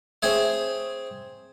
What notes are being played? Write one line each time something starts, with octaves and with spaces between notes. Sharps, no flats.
C4 G#4 C#5 E5